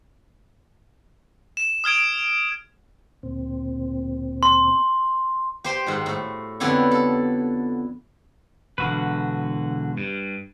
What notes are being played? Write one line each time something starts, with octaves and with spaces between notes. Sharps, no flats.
E7
D#6 F6 G#6 D7
D2 A#2 C4
C6
G4 C5 G5
G#2 D#3 F#4
A2
F2 D3 B3 E4 G4 C#5
A4
E1 D3 F#4 B4
G2